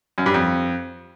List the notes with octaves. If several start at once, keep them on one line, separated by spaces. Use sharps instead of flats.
F#2
G2
F2